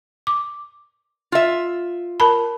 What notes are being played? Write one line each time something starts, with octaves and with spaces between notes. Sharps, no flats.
D6
F4 E5
A#4 A5 B5